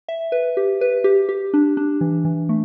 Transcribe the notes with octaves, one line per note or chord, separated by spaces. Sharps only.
E5
B4
G4
B4
G4
G4
D4
D4
E3
E3
A3